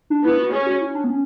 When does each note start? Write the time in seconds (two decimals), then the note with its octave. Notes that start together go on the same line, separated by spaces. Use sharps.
0.10 D4
0.24 B3 E4
0.39 F#4
0.52 C#4 G#4
0.66 F#4
0.81 E4
0.95 D4
1.04 B3
1.10 C#4